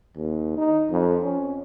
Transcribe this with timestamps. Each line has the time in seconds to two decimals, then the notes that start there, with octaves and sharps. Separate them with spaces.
0.16 D#2
0.57 D#4
0.90 F2
1.22 C#4